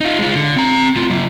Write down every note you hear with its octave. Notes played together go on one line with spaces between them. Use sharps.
D#4 F4
G#3 F4
D3
C4 A#5
A2 F4
F#3 A#3